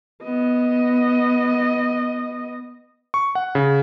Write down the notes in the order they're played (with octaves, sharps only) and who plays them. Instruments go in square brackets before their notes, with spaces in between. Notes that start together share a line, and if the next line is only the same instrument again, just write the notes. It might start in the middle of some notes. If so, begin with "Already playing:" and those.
[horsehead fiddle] B3 D#5
[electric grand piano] C#6
F#5
C#3